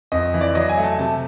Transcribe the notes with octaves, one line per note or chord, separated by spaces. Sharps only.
F2 D#5
E3
D5
F#3 D#5
G#5
A3
A5
C3 A5